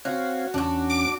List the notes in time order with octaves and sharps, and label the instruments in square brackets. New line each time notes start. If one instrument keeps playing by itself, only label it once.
[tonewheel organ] C4 C#5 F5 [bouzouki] F#4
[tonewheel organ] E2 C#4 [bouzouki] D4 F#4
[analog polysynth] D6 D7